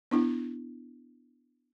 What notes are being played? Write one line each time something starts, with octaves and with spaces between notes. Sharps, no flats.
B3 D4 E4